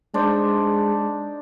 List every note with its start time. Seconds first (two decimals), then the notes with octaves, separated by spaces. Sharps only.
0.14 G#3 D4 D#4 C5